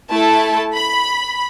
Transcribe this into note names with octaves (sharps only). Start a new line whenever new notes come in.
A3 E4 A4 A5
B5